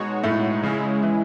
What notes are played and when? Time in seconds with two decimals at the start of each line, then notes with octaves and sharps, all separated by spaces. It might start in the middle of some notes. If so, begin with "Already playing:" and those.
Already playing: B2 G#3 D#4 F#4 C#5
0.23 A2 A3
0.63 C#3 G#3 C#4 E4
1.03 E3